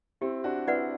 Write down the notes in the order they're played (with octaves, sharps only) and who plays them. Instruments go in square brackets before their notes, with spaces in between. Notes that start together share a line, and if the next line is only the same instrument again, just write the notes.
[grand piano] C4 E4 [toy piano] G4
[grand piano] D4 F#4
[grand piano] C4 E4 [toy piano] B4 D5 F#5